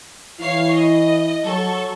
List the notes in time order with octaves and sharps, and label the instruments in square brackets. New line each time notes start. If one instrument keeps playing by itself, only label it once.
[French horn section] E3 E4 [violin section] C#5 F5 C7
[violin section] D#5
[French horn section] F#3 [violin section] A4 C#6